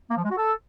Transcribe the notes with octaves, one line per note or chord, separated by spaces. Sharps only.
A#3
F3
G#3
F#4
A4